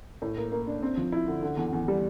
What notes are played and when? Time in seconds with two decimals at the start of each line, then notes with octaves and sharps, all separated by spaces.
0.22 A2
0.37 A#3
0.52 A#3
0.67 D4
0.83 C4
0.97 F3
1.12 E4
1.27 D3
1.43 D3
1.57 E2
1.73 E2
1.88 G3